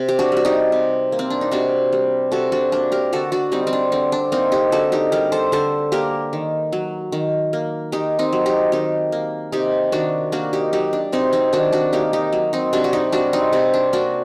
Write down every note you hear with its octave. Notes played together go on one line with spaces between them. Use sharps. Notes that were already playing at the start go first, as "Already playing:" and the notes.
Already playing: C3
G4
D4 F#4
G3 F#4
D#4 G4
C3
A#3
C4
D4
D#4
C3 D4 F#4
G3
C3 F#4 A4
D4 F#4
A#3 D4
G4 A#4
D3 F#4 A4
D4 F#4
G3 C4 D#4
C4
D4
D3 C4
D4
A#3 C4 D#4
D#4 G4
D3 F#4 A4
D#4 G4
G3 G4 A#4
A4 C5
D3 A4 C5
A#3 G4 A#4
D#3
F#3
D#3
A#3
D#3 D#4 G4
C4 D#4
F#3
D#4 G4
D#3 D#4 G4
A#3
C3 D#4 G4
D#3 D4 F#4
A#3 D4 F#4
D#4 G4
F#3 D#4 G4
D4
C3 C4 D#4
C4 D#4
D#3 D4 F#4
D4 F#4
A#3 D#4 G4
D#4 G4
F#3
C4 D#4
C3 D4 F#4
F#4
D#4 G4
G3 D4 F#4
C4 D#4
C3 C4
D4
A#3 D4 F#4